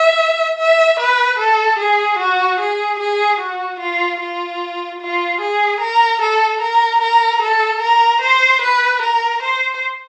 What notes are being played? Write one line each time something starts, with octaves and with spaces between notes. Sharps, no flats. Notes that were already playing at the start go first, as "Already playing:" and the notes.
Already playing: E5
E5
B4
A4
G#4
F#4
G#4
G#4
F#4
F4
F4
F4
G#4
A#4
A4
A#4
A#4
A4
A#4
C5
B4
A#4
C5